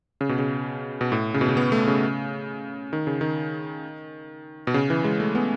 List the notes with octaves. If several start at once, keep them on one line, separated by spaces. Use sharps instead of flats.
C#3
B2
C#3
B2
A2
C#3
B2
C#3
B3
A3
C#3
D#3
C#3
D#3
B2
C#3
E3
G#3
A3
B3